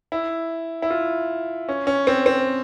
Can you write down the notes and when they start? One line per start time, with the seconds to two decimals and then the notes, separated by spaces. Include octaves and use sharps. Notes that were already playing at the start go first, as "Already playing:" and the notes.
0.12 E4
0.82 E4
0.90 F4
1.69 C#4
1.87 C#4
2.07 C4
2.26 C4